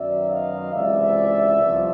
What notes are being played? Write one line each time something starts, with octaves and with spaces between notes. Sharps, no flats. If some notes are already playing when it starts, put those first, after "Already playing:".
Already playing: F#2 D#3 F#3 B3 D5 E5
D#5 F5
C#2 C3 E3 D5 E5
C2 C3 F3